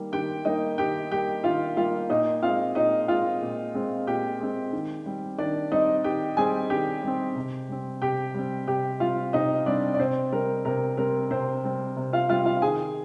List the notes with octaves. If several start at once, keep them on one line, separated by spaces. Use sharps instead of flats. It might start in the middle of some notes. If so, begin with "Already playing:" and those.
Already playing: D#3 G3 A#3
D#3 G4 G5
G3 A#3 D#4 D#5
D#3 G4 G5
G3 A#3 G4 G5
D#3 F4 F5
G3 A#3 F4 F5
A#2 D#4 D#5
G#3 C4 F4 F5
A#2 D#4 D#5
G#3 C4 F4 F5
A#2
G#3 C4
A#2 G4 G5
G#3 C4
D#3
G3 C4
D#3 D4 D5
G3 C4 D#4 D#5
D#3 G4 G5
G3 C4 G#4 G#5
D#3 G4 G5
G3 C4
C3
G3 C4
C3 G4 G5
G3 C4
C3 G4 G5
G3 C4 F4 F5
C3 D#4 D#5
G3 C4 D4 D5
D5
C3 C4 C5
G3 C4 A#4
C3 A#4
G3 C4 A#4
C3 C4 C5
G3 C4
C3
F4 F5
G3 C4 F4 F5
F4 F5
D#3 G#4 G#5